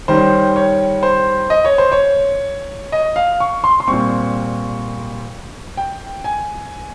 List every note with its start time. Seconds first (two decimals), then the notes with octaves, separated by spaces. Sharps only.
0.08 D#3 G3 C#4 C5
0.56 C#5
1.03 C5
1.50 D#5
1.65 C#5
1.78 C5
1.92 C#5
2.92 D#5
3.16 F5
3.40 C#6
3.64 C6
3.80 C6
3.88 A#2 G3 C4 C#6
5.77 G5
6.24 G#5